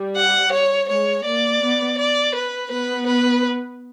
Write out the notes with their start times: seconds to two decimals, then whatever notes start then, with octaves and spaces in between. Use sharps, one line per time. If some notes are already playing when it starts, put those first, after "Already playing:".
Already playing: G3
0.16 F#5
0.53 C#5
0.89 G#3 C#5
1.25 A#3 D5
1.62 B3
1.98 D5
2.35 B4
2.71 B3 B4
3.07 B4